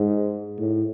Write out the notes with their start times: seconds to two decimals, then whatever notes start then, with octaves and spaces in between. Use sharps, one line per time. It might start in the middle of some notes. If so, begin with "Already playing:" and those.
Already playing: G#2
0.59 A2